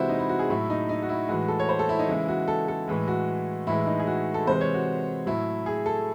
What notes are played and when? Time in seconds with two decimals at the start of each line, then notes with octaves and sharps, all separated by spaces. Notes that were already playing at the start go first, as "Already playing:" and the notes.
Already playing: C3 E3 G#3 E4 F#4 C5
0.09 D#4
0.19 E4
0.29 F#4
0.39 G#4
0.50 A2 F#3 E4
0.70 D#4
0.89 D#4
1.02 F#4
1.09 E4
1.28 A2 E3 G#3 F#4
1.48 A4
1.59 C#5
1.69 C5
1.79 A4
1.89 E4
1.99 D#4
2.08 C#3 E3 G#3 E4
2.28 F#4
2.48 A4
2.68 A4
2.88 A2 E3 G#3
3.08 F#4
3.67 A2 E3 G#3 E4
3.80 E4
3.87 D#4
4.00 G#4
4.07 F#4
4.34 A4
4.47 C3 E3 G#3 C5
4.61 C#5
4.74 F#4
5.26 A2 F#3 E4
5.66 G#4
5.86 A4